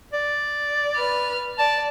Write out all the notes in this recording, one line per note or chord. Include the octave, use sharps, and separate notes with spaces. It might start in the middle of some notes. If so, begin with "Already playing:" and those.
D5
B4 F6
D5 A5